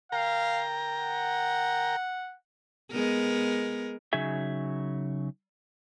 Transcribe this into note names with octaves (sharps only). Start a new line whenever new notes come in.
A#4 F5 G5 A#5
F#5
G#3 B3 A#4
C#3 F#3 D#4 G#4 E5